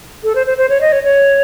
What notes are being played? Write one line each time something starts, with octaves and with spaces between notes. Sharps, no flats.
A4
C5
C5
C5
C#5
D#5
C#5
C#5